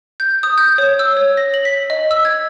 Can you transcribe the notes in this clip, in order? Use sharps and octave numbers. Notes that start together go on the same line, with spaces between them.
G6
D#6
G6
C#5
E6
C#5
A#6
F#7
B6
D#5
E6
G#6